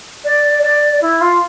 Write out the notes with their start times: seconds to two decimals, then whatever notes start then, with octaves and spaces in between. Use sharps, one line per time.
0.25 D5
0.63 D5
1.02 E4
1.21 F4